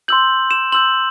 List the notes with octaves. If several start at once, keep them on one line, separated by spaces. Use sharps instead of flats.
C6 E6 G6 F#7
E7
C6 E6 G6 F#7